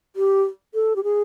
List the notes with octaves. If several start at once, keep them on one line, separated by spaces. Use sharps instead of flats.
G4
A4
G4
G#4